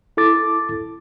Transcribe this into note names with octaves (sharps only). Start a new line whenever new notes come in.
E4 A4 D6 A6